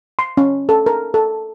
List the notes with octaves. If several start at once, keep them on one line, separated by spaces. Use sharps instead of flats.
C6
C#4
A4
A#4
A4